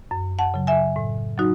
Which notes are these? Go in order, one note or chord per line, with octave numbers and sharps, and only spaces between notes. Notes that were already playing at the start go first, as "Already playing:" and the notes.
F#2
F#5 A5
C#3 F#3
E5 G#5
A2
F#3 D#4 F#4